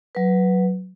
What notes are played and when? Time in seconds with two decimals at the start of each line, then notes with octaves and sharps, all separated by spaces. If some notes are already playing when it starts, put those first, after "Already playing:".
0.15 F#3 B4